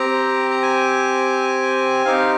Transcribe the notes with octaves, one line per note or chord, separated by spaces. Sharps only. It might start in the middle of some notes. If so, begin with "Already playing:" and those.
Already playing: C4 G4 A#5
A#5
G#5
C4 D#4 G4 F5